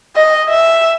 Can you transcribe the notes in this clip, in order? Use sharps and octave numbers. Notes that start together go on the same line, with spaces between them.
D#5
E5